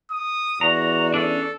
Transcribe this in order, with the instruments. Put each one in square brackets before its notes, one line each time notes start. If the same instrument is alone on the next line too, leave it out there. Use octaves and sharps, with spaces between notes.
[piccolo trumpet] D#6
[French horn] E2 [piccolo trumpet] F#4 [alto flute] D5 [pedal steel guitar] A#5
[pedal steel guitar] C#4 D4 [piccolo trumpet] A4